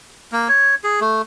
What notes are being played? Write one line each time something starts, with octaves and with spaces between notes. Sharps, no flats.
A#3
C#5
G#4
A3